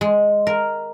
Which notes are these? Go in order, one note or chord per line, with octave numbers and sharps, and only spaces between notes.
G#3
A#4